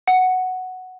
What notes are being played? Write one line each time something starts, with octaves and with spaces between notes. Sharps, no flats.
F#5